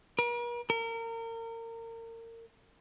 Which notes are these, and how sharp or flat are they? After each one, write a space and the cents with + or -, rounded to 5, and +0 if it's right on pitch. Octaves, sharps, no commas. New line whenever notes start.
A#4 +45
A#4 -30